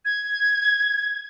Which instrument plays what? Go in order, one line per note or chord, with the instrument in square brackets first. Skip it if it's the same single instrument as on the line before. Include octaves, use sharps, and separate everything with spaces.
[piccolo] G#6